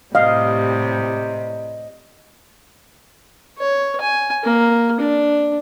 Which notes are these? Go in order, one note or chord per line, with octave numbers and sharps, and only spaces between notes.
A2 C3 G3 D#5 F5
C#5
G#5
A#3
D4